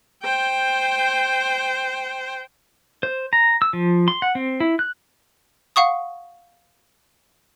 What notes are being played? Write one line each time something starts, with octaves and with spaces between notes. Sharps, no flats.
C5 G5
C5
A#5
E6
F3
C6
F#5
C4
E4
F#6
F5 F#5 C#6 D#6